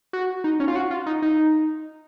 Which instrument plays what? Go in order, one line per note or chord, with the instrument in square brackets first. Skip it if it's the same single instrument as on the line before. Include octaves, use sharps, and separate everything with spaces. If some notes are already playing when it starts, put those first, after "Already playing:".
[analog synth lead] F#4
D#4
C#4
F4
F#4
F4
D#4
D#4